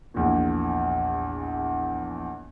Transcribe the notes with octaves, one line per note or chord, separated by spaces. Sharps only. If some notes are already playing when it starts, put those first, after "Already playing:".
A#1 E2 A#2